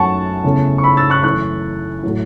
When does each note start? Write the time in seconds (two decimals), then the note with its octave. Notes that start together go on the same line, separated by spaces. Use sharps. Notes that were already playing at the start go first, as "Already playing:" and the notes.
Already playing: F#2 F#3 A3 F#5 A5 C#6
0.44 E2 C#3 A3
0.78 C#6
0.83 B5 E6
0.97 E6 A6
1.10 C#6 F#6
1.23 F#2 E3 A3 C#6 F#6
2.03 A2 F#3 A3